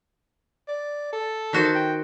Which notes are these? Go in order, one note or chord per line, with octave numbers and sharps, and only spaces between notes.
D5
A4
D#3 F#4 C5
G5